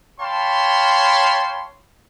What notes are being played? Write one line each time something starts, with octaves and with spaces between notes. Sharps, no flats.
C#5 F5 G5 A5 B5 C6